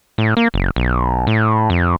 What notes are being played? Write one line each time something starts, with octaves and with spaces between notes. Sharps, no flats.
A2
A#3
F#1
B1
A2
F2